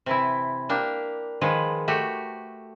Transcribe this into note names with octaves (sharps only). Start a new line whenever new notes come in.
C3 E3 E4
A#3 D4 G4
D#3 F3 G#3 G#4 B4
A3 F#4 G4